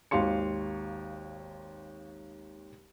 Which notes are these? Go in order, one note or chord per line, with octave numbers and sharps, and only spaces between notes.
G#1 D#2 F5 C6 C#7